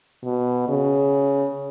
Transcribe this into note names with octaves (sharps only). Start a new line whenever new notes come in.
B2
C#3